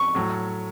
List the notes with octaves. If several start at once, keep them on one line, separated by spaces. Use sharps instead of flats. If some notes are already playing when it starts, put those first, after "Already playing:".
Already playing: C#6
A2 F#3